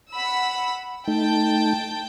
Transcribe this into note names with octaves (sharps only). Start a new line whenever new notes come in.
F#5 B5 E6
A3 D#4 G5 A5 G6